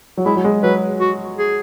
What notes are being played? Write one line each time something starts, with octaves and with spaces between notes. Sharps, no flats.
F#3
G#3 E4
F#3
G#3
F#3 B4
F#4
G#4